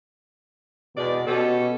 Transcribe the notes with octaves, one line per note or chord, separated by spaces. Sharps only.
E2 B2 G#3 D5
B2 C#4 G4 A4